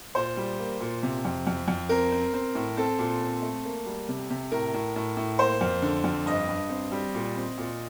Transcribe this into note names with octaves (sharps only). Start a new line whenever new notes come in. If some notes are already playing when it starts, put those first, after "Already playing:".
A#2 C5
G3
A#3
A#2
C3
F2
F2
F2
C4 A#4
C4
C4
A2
C4 A4
A#2
C4
A3
A#3
G3
C3
C3
A2 A#4
A2
A2
A2
A#3 C5
F2
D3
F2
G2 D#5
G2
C4
G3
A#2
C4
A#2